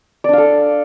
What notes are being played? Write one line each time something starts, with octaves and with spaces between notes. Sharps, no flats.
D4 A4 D5 F5